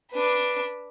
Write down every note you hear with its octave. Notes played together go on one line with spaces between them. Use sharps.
D4 B4